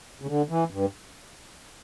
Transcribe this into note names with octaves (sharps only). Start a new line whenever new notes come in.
C#3
D3
E3
G2